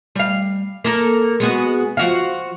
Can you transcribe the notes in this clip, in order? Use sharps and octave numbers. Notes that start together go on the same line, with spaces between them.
G3 F5
A#3 A4 A#4
G#3 B3 F#4
F3 F#4 F5